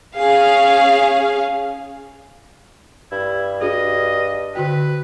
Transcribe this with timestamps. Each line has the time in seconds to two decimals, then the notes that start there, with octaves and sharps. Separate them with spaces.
0.16 C#4 G#4 F5
3.12 G2 E4
3.61 D4 F#4 G#4 D#5
4.55 D3 F#4 B4 G5